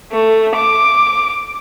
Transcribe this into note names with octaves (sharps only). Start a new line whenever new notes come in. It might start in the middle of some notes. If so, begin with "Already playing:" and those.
A3
D6